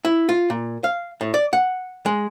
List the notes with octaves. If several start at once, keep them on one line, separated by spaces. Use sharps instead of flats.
E4
F4
A#2
F5
A2
D5
F#5
G#3